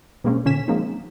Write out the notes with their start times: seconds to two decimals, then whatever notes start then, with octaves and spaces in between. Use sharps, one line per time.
0.24 B2 G3 G#3 A#3 C4 C#4
0.45 A#2 D3 C#4 G#5 B6 E7
0.68 F3 F#3 G#3 A#3 C4 D#4